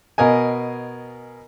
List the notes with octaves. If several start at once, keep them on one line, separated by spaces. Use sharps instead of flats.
B2 A#4 D#5 G#5